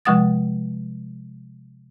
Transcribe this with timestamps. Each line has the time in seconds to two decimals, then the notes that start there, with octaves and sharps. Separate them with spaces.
0.05 C3 F3 G#3 F#5 D#6 A6